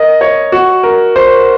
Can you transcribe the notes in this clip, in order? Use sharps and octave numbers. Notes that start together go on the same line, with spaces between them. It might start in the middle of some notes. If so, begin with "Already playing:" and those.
Already playing: A#4 D#5
C#5
F#4
A#4
C5